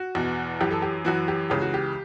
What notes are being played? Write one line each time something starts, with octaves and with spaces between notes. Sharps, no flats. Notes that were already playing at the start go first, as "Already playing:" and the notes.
Already playing: F#4
E2 B2
F#2 E3 G4
A4
G4
F#2 E3 F#4
G4
C#2 C#3 E3 G4
F#4
G4